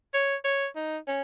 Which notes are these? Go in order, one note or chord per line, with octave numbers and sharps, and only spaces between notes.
C#5
C#5
D#4
C#4